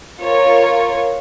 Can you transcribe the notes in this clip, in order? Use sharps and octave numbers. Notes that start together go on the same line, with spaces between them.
F4 A#4 C#5